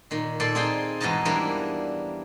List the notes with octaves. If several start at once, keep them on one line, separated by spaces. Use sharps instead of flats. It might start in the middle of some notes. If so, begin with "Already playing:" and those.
A#2 D#3
A#2 A4 D5 C6
C4 D#4 F4 G#4 C5 G5
E2 G#2 B2 D#4 D#5 A5
E3 G3 A#3 D4 A#4 C5